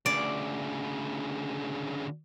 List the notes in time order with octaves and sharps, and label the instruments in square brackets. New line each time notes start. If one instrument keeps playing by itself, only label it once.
[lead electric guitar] D2 C#3 [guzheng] D5